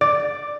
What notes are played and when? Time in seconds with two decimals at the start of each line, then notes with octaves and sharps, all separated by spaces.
0.01 D5